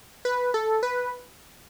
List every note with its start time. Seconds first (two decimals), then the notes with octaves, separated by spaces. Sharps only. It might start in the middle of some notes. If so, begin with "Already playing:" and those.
0.25 B4
0.54 A4
0.83 B4